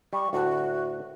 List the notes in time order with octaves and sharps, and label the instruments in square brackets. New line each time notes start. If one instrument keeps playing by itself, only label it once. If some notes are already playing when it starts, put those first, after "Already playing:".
[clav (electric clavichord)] G3 [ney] C#6
[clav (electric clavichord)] D2 A2 A4 [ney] F#4